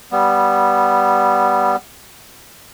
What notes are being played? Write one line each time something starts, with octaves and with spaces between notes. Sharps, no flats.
G3 B3